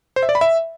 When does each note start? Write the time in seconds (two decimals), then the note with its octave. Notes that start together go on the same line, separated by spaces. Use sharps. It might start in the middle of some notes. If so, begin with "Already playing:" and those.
0.16 C5
0.23 E5
0.29 D5
0.35 B5
0.41 E5